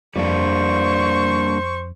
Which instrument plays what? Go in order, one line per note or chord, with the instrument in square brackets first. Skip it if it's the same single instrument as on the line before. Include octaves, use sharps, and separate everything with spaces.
[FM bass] F2 [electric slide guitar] G3 A#3 D4 [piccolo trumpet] C5 [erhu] C#6